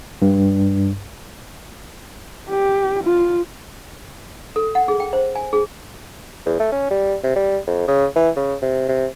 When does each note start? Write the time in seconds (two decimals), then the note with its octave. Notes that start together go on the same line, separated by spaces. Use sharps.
0.22 G2
2.50 G4
3.03 F4
4.56 A4
4.75 F#5
4.88 G#4
5.00 G5
5.13 C5
5.35 G#5
5.53 G#4
6.46 E2
6.60 A3
6.72 C#4
6.91 G3
7.24 C3
7.36 G3
7.67 F2
7.88 C#3
8.16 E3
8.37 C#3
8.62 C3
8.89 C3